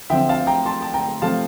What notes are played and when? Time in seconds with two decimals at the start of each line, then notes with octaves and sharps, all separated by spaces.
0.10 D3 F3 C4 E5 G5
0.29 F5 A5
0.47 G5 A#5
0.66 A5 C6
0.82 A5
0.94 G5 A#5
1.22 C3 F3 A3 C4 F5 A5